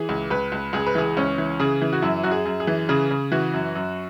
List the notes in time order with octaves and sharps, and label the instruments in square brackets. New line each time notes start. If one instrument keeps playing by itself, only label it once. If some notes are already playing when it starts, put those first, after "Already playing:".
Already playing: [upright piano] E3 G#4
C#2
C#2 B4
C#2
C#2 G#4
B4
E3 G#4
C#2 C#4
E3
C#3 G#4
E3
F#4
F#2 E4
F#2 F#4
G#4
F#2
G#4
E3
C#3 G#4
C#3
E3 F#4
F#2
F#2